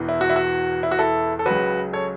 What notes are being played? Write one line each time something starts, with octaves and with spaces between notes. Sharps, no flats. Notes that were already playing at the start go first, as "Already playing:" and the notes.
Already playing: E1 E2 E3
E4
F#4
E4
F#4
E4
F#4
E4 A4
A4
C#2 C#3 F#3 F#4 B4
A4 C#5